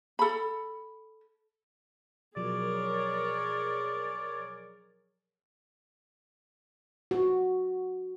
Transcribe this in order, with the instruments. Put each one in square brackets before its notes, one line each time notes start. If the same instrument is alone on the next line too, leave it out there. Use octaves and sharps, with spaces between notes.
[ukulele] A4 B5
[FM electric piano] B2 F3 F#3 [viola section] G#4 A#4 C#5 [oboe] D5
[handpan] F#4